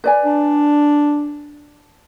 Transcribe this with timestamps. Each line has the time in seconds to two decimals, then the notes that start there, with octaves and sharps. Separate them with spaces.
0.04 B4 D5 G#5
0.24 D4